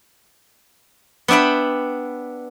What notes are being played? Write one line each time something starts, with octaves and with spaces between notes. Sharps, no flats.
B3 D4 E5 G5 B5